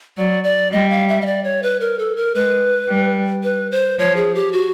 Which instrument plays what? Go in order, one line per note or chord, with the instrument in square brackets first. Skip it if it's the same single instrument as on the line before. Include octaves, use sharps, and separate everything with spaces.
[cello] F#3 [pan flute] D5
[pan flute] D5
[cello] G3 [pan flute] D#5
[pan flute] F5
E5
D#5
D5
C#5
B4
A#4
A4
A#4
[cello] G#3 [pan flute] B4
[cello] G3
[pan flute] B4
C5
[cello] F3 [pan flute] C#5
[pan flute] G#4
G4
F#4